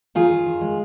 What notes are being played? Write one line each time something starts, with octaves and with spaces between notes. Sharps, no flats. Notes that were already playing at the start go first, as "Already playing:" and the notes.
D#3 F4 G#4
D#3
D#3
G#3